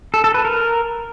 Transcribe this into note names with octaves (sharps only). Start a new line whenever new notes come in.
A4
A4
B4
A#4